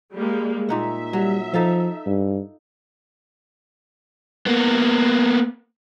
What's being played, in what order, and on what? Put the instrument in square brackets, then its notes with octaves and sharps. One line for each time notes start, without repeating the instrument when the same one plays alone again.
[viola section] G3 G#3 A#3
[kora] A#2 D#4 F#5 [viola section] E5
[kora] F#3 [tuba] G3
[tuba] F3 [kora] D#4 A4 F5
[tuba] G2
[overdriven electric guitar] A#3 B3